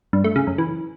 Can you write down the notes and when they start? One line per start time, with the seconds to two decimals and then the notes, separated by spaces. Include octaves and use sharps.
0.13 G2
0.24 A3
0.36 C#3
0.47 F#2
0.58 E3